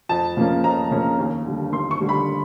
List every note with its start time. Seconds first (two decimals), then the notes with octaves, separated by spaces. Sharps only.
0.09 F2 A5
0.37 C#3 F3 A#3 C#4
0.64 F2 A#5
0.91 C#3 F3 A#3 C#4
1.18 D#2
1.45 D3 G3
1.72 D#2 C6
1.91 C#6
2.01 D3 G3
2.09 B5